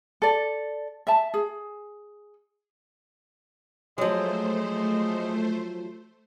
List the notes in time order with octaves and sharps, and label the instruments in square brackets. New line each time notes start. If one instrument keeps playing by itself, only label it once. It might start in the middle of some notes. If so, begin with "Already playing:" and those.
[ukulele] A4 D5
E5 A5
G#4
[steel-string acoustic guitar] F3 F#3 [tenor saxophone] G#3 [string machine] A3 C5